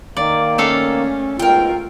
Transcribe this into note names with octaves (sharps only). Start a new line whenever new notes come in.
D#3 A#3 D5
A3 C#4 A4 F5
G#2 B2 F4 A#4 G5